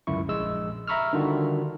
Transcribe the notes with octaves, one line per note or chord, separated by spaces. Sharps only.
G1 C#2 F#2 E4 C#6
A#1 G#3 E6
E5 A#5 B5 C#6 E6 F6
D3 D#3 G3 D4 F4 F#4